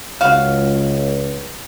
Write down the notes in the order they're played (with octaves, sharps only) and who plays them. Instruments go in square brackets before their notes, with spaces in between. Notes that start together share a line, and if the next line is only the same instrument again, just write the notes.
[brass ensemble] C#2 [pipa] F#4 F5